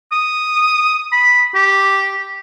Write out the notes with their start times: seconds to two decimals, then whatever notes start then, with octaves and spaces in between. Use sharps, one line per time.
0.12 D#6
1.12 B5
1.55 G4